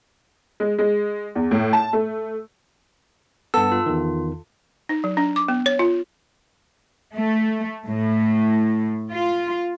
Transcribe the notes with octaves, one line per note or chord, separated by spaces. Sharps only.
G#3
G#3
E2
A2
A5
A3
G2 B3 A4 E6
F4
E2 D#3
D#4
F#3
D4
D6
B3
C#5
F4
A3
A2
F4